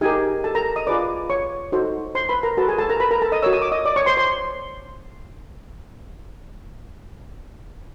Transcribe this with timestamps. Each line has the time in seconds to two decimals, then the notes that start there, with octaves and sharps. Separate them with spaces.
0.01 D#4 G4 G#4 A#4 G#5
0.44 A4 A5
0.55 A#4 A#5
0.76 D#5 D#6
0.87 F4 G#4 B4 D5 D6
1.30 C#5 C#6
1.72 D#4 F#4 A4 C5
2.15 C5 C6
2.29 B4 B5
2.43 A#4 A#5
2.57 F#4 A4 B4 A5
2.68 G#4 G#5
2.79 A4 A5
2.89 A#4 A#5
3.00 B4 B5
3.11 A#4 A#5
3.22 A4 A5
3.32 D#5 D#6
3.42 F#4 A#4 C#5 E6
3.53 D#6
3.62 D6
3.72 D#5 D#6
3.85 D5 D6
3.96 C#5 C#6
4.06 C5 C6
4.17 C5 C6